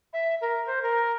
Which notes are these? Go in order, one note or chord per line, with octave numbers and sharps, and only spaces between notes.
E5
A#4
C5
A#4